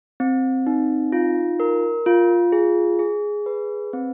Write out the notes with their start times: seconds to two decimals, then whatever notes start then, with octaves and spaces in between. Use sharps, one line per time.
0.20 C4
0.67 D#4
1.12 F4
1.60 A#4
2.06 F4
2.52 G#4
2.99 G#4
3.46 B4
3.93 C4